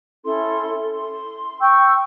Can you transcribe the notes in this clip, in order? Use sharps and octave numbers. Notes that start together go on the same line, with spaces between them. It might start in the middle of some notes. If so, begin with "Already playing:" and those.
C#4 E4 A4 C6
C6
G5 C#6 E6 G6